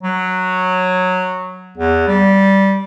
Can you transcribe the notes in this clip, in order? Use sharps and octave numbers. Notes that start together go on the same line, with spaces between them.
F#3
E2
G3